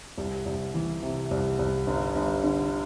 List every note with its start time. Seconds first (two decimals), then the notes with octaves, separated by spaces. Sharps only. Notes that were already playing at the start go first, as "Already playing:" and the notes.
0.18 C2
0.46 C2
0.74 E3
1.02 C3
1.31 C2
1.59 C2
1.87 G1
2.15 G1
2.44 D3